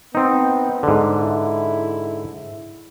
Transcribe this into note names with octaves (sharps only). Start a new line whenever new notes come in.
B3 C4 D#4
G#2 D3
E4